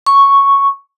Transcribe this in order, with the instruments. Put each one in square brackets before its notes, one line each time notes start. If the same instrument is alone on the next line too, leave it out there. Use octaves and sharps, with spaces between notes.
[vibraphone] C#6